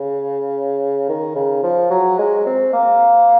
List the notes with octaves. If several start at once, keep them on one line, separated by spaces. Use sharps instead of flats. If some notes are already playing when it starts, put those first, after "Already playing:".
Already playing: C#3
D#3
C#3
F3
F#3
G#3
C4
A#3